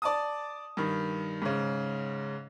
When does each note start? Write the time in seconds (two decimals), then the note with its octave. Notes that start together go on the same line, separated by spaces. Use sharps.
0.02 D5 A5 D#6
0.77 G2 D#3
1.42 G#2 C#3